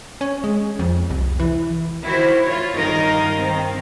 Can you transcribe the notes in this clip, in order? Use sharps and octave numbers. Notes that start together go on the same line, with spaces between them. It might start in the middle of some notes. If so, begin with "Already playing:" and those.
C#4
G#3
F2
C2
E3
D#3 E4 F#4 C5
F4 C#5
G2 D#3 D#4 A#4 D#5 F5
D#3 C4